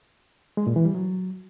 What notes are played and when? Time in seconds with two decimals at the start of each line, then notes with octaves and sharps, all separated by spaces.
0.57 G#3
0.67 A#2
0.76 E3
0.85 G3
0.95 F#3